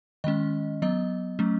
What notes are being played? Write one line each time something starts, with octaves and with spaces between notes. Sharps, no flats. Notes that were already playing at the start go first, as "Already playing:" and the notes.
D#3 G#3 C#4 D#5
F#3 B3 D#5
F#3 A3 C#4